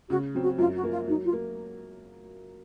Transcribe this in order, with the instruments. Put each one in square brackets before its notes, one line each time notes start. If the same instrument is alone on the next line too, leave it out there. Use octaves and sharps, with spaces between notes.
[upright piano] C#3 [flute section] F#4
[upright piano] F#3 C4
[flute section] F#4
[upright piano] F#2 [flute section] F4
[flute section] F#4
[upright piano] F3 A#3
[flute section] F4
[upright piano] F#3 [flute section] D#4
[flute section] F4
[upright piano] A#3